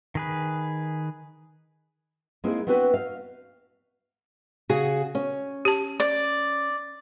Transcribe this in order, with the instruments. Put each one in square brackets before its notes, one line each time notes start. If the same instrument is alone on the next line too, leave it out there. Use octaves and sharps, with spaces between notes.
[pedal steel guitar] D#3 G#4 B4
[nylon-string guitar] G#3 A#3 C4 D#4 E4 G#4
B3 C4 D4 F#4 G#4 B4
F5
[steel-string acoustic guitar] C#3 F#4 G#4
C#4
[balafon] G4 A5
[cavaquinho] D5